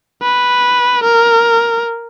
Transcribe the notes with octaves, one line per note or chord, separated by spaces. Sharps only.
B4
A#4